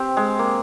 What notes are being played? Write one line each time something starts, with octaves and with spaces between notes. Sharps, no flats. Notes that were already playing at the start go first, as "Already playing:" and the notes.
Already playing: C4 G4 C5
G#3
A#3